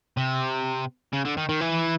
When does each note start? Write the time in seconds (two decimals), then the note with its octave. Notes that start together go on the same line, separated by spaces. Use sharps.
0.17 C3
1.13 C#3
1.25 D3
1.37 D#3
1.49 D#3
1.61 E3